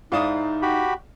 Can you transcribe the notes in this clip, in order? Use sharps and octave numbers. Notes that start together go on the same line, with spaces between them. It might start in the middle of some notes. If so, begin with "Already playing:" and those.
G#2 D#4 E4 D5 F5 D#6 E7
F#4 G4 B5